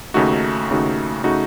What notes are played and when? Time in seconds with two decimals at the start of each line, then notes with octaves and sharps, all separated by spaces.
0.14 D#2 C#3 A3 D#4 F#4
0.70 D#2 C#3 A3 D#4 F#4
1.24 C#3 A3 D#4 F#4